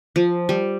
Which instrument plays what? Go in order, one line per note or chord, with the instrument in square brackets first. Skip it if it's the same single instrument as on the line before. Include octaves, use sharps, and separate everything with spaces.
[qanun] F3
G3